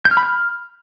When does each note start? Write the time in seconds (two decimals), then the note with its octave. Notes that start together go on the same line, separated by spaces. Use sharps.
0.05 G6
0.11 F6
0.17 B5
0.23 F6